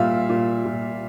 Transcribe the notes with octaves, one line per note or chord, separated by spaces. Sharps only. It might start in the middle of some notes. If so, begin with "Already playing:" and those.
Already playing: A#2 G3 E5 F5
A#2
A#2